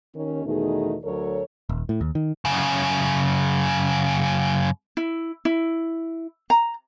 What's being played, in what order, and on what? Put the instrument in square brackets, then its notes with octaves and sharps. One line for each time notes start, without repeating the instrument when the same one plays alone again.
[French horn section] D#2 D#3 C#4
E2 B2 D#3 A3 D#4 G#4
D2 F#3 A4 A#4 C#5
[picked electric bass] D#1
A2
D#2
D#3
[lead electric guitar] F#2 C#3
[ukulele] E4
E4
A#5